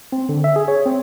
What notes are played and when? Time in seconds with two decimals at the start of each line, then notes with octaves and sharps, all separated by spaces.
0.12 C4
0.29 D3
0.44 E5
0.56 G#4
0.68 C#5
0.86 C4